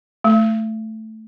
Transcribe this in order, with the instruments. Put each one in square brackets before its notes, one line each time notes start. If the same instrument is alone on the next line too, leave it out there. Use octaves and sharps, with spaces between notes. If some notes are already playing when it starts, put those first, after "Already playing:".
[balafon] A3